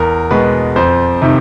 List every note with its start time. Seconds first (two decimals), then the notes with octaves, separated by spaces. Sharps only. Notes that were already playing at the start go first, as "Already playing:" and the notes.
Already playing: E2 A#4
0.31 B2 G#3 B3 B4
0.76 F2 C5
1.22 C3 D#3 E5